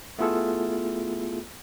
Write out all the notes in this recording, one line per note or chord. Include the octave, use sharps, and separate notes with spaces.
A3 B3 E4 F4 G#4 A4